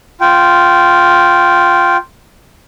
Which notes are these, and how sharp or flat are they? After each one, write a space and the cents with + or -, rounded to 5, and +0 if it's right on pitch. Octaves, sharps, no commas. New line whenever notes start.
F4 +0 G5 -15